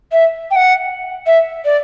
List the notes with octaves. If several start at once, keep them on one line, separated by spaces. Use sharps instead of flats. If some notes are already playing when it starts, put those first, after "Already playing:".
E5
G5
F#5
E5
D5